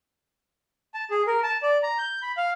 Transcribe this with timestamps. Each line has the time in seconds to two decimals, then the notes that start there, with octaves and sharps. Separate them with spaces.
0.94 A5
1.11 G#4
1.27 A#4
1.43 A5
1.63 D5
1.83 A#5
1.98 G6
2.22 B5
2.37 F5